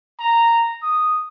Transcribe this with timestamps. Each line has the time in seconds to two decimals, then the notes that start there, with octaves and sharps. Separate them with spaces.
0.19 A#5
0.83 D#6